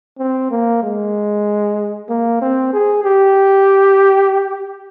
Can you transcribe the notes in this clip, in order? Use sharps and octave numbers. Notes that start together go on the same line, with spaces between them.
C4
A#3
G#3
A#3
C4
G#4
G4